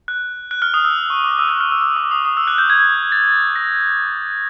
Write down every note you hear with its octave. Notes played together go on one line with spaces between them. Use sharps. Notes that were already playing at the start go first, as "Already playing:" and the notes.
F#6
F#6
F6
D#6
E6
C#6
D6
E6
F#6
F6
E6
E6
D6
D#6
D#6
E6
F#6
G6
G#6
A6
A#6